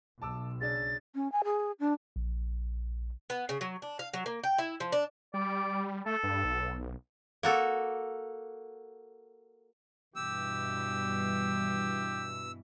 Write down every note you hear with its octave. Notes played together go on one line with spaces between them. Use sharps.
B1 A5 D6 E6
C#3 D4 A6
C#4
G#5
G#4
D4
A#1
B3
C#3
F#3
D4
F5
F#3
A#3
G5
E4
F3
D4
G3 D5
A3 A4
G2
B1
A#3 F#4 A4
G2 B2 E3 G4 E6